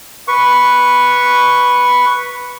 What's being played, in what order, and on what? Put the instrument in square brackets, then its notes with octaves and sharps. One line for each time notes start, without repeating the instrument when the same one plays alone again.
[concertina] B4 C#6